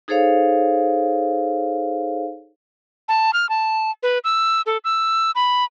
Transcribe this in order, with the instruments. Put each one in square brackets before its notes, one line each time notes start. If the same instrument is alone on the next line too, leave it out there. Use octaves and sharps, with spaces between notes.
[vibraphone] D#4 G#4 A4 C5 C#5 F5
[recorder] A5
F6
A5
B4
E6
A4
E6
B5